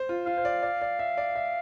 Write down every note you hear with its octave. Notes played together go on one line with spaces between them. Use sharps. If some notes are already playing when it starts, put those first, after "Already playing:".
Already playing: C5
F4
F4 F5
C5
D5
D5
D5
E5
D5
E5